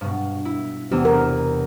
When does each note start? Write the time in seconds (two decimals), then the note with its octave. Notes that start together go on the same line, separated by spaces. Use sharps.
0.01 G2 B2
0.45 E4
0.91 E2 C3 B3 D4 G4 E6
1.05 A#4